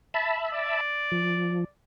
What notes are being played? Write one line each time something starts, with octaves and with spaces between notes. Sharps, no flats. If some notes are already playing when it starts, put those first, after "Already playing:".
E5 A5 B5
D5
F3